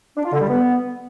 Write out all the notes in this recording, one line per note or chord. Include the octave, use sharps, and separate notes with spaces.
D4
F4
D3
G3
B3